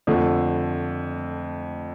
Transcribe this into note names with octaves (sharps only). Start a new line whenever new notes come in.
F2 D3 A3